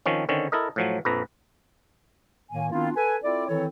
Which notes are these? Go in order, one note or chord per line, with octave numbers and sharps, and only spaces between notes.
D#3 F3 C4 C#4
D3 D#3 C4 C#4
E4 A4 A#4 D#5
A2 F3 F#3
A#1 F2 B4 A#5
A2 D#3 A#3 G#5
D#3 B3 C4 D4 E4 F4
A4 B4 G#5
C4 E4 F4 A4 D5
D#3 E3 C4 E4 A4 C#5